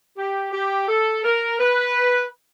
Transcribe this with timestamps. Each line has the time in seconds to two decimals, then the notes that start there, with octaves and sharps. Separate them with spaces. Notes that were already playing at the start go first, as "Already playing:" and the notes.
0.17 G4
0.52 G4
0.88 A4
1.24 A#4
1.59 B4